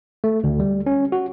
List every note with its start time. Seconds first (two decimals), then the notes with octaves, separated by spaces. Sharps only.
0.24 A3
0.44 D2
0.60 G3
0.86 C#4
1.12 F#4